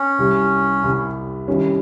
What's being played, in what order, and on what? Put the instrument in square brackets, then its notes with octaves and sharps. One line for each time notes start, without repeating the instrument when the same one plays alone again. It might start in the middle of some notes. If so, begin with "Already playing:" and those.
Already playing: [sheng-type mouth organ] C#4
[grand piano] C2 C3 G3
C2 C3 G3
C2 C3 D#3 G3 C#4